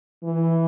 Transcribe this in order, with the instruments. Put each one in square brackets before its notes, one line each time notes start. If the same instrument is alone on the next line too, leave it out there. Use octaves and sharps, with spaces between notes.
[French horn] E3